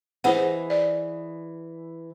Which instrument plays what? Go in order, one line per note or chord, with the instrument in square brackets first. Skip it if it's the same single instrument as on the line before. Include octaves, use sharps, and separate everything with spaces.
[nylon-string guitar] E3 G#4 D#5 [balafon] C5 F#5
[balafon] D5